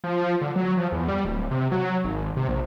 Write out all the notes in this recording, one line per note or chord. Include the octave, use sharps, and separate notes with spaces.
F3
D3
F#3
F3
E2
G3
D1
C3
F#3
G#1
C3
A#1